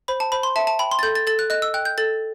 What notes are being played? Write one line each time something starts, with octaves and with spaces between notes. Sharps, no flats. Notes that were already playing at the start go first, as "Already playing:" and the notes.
C5 B5
A5
C5 B5
C6
E5 A5
A5
G5 B5
C6
A6
A4 G6
A6
A4 A6
F#6
D#5 F#6
E6
G5 F#6
G6
A4 A6